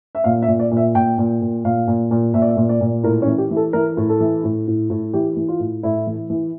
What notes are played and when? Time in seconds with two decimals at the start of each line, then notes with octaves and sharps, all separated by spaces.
0.15 E5
0.24 A#2 F5
0.42 E5
0.48 A#2
0.59 D5
0.71 A#2
0.77 E5
0.95 A#2 G5
1.18 A#2
1.42 A#2
1.65 A#2 F5
1.88 A#2
2.11 A#2
2.34 A#2 E5
2.42 D5
2.49 E5
2.57 A#2
2.69 D5
2.81 A#2
3.03 A2 A#4
3.22 C#4
3.27 E3
3.38 G4
3.51 E3
3.57 A4
3.73 E3 A#4
3.97 A2
4.09 A4
4.20 E3
4.44 A2
4.67 A2
4.90 A2
5.13 E3 G4
5.36 E3
5.48 F4
5.59 A2
5.83 A2 E4
6.07 E3
6.30 E3